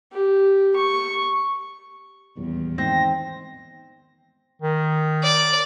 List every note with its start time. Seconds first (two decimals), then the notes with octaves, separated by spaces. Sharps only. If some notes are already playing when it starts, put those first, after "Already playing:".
0.12 G4
0.76 C#6
2.37 D#1 E2
2.78 G#2 D#3 C4 A#6
4.61 D#3
5.24 D5